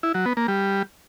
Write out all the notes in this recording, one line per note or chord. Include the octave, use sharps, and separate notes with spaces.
E4
F#3
B3
A#3
G3